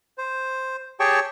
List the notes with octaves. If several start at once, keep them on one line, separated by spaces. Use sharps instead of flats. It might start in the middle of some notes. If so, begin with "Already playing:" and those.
C5
G4 G#4 C#5 G5 A5 C#6